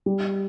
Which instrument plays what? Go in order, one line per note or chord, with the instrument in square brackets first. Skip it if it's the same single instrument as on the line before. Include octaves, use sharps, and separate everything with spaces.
[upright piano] G3